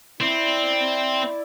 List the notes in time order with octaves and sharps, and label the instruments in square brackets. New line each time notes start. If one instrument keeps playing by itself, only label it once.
[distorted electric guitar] C4 [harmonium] E4 D5